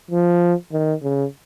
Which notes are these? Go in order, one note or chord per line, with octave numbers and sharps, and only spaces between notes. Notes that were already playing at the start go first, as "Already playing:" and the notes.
F3
D#3
C#3